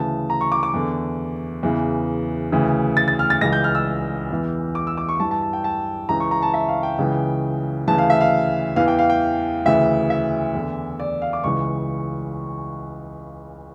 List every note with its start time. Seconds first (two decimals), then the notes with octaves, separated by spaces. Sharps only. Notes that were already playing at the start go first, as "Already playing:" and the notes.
Already playing: D2 C#3 E3 A5
0.30 A#5
0.41 C#6
0.52 D6
0.63 D6
0.74 E2 D3
1.63 E2 C#3 E3
2.52 D2 C#3 E3
2.97 A6
3.08 A6
3.19 F6
3.30 A6
3.41 C#2 C#3 E3 A#6
3.53 G6
3.64 F6
3.75 E6
4.31 E2 E3
4.75 D6
4.87 E6
4.97 D6
5.09 C#6
5.20 G2 E3 A5
5.31 A5
5.42 A5
5.53 G5
5.64 A5
6.09 C#2 C#3 E3 A#5
6.20 C#6
6.31 A#5
6.42 A5
6.54 E5
6.68 F5
6.83 G5
6.98 C#2 C#3 E3
7.88 D2 C#3 E3 A5
7.98 F5
8.10 E5
8.21 F5
8.76 E2 E3 F5
8.88 G5
8.99 F5
9.10 G5
9.66 D2 C#3 E3 E5
10.10 E5
10.55 E2 D3
11.00 D5
11.22 F5
11.33 D6
11.44 C#2 C#3 E3 C#6